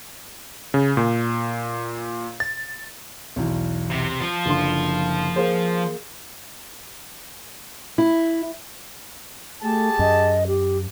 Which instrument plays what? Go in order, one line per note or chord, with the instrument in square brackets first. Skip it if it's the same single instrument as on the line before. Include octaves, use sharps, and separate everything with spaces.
[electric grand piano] C#3
A#2
A6
[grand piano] B1 E2
[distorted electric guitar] C3
F3 F4
[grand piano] F#1 D3 C6
A#3 G#4 C5
[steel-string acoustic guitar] E4
[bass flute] A3 [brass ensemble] G4 G#4 A5
[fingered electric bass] F#2 [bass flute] D#5
[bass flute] G4